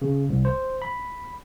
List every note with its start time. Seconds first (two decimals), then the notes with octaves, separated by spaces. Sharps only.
0.02 C#3
0.30 C2
0.45 C5
0.82 B5